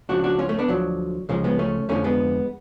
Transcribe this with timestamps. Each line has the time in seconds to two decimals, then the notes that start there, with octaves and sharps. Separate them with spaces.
0.09 C#2 C#3 F3 D4 F#4
0.24 D4 F#4
0.39 C#4 F4
0.49 A3 C#4
0.59 B3 D4
0.68 D2 D3 F3 F#3
1.29 C#2 C#3 F3 G#3
1.44 G#3 B3
1.59 A3 C#4
1.89 F2 D3 F3 A3 C#4
2.04 G#3 B3